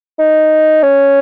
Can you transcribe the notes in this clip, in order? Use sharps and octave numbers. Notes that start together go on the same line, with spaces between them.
D#4
C#4